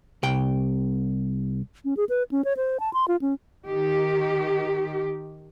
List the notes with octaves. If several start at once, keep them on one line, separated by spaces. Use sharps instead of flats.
C2 G5
C#4
G#4
B4
C#4
C#5
C5
A5
C6
F4
C#4
D#3 G4